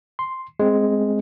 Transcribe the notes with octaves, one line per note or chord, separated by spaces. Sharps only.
C6
G#3 C4